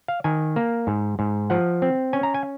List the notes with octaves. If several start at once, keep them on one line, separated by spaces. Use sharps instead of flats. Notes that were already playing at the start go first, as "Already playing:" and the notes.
F5
D#3 G#5
A#3
G#2
G#2
F3 F#5
C4
C#4 G#5
A#5
G#5